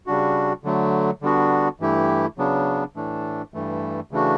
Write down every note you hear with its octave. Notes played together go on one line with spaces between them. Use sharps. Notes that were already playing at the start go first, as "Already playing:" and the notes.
C#3 G3 D4 F#4
D3 F#3 A3
D3 G3 B3 D4 F#4
G2 E3 A3 E4 G4
C#3 F#3 B3 D4
A2 E3 A3 D4
G2 E3 A3
C#3 E3 A3 D4 F#4